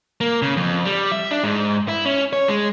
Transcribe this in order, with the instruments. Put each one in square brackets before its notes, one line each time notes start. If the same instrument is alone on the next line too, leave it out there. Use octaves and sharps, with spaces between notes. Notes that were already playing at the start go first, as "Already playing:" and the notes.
[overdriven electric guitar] A#3
C#3
F2
G3
E5
D4
G#2
E4
C#4
C#5
G#3